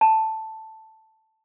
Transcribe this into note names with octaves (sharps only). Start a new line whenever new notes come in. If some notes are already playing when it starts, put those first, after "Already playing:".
A5